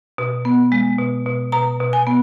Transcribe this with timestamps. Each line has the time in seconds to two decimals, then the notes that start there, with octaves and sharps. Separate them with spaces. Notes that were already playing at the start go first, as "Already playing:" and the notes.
0.18 B2
0.45 B3
0.72 G#3
0.98 B2
1.26 B2
1.52 B2 A#5
1.80 B2
1.93 G#5
2.07 B3